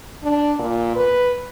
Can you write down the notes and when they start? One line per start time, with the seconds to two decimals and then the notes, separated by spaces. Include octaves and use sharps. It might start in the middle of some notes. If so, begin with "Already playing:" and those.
0.23 D4
0.59 A#2
0.95 B4